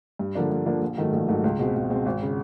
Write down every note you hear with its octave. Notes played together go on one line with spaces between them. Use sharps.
G2
D3 F3 A#3 D4
G2
D3 F3 A#3 D4
A#1
G#2 D#3 F#3 A3
A#1
G#2 D#3 F#3 A3
C#2
B2 G#3 C4
C#2
B2 G#3 C4
G#1
C#3